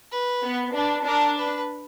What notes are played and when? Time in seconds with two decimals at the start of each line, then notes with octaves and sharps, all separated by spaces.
0.12 B4
0.43 B3
0.74 D4 B4
1.05 D4 A#4
1.38 B4